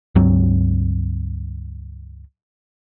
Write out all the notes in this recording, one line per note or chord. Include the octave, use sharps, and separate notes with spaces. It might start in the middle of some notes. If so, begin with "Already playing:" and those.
C#2 G2 F#3 C4